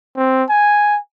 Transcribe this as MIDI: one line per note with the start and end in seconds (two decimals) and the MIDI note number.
0.17 0.44 60
0.50 0.98 80